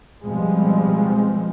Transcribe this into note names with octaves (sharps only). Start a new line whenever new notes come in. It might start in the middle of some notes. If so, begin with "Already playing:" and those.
B2 F3 G3 G#3 C4